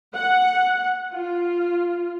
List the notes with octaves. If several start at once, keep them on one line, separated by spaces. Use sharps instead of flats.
F#5
F4